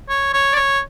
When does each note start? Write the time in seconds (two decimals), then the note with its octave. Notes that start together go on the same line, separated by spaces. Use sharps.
0.09 C#5
0.33 C#5
0.53 D5
0.56 C#5